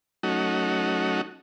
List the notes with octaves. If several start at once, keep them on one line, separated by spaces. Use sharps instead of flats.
F#3 A3 C#4 D#4 F#4